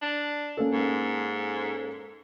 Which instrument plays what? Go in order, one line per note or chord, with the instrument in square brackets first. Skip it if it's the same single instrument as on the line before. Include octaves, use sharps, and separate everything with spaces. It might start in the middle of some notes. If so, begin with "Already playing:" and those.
[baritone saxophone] D4
[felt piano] A#3 C#4 A4
[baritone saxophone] G#2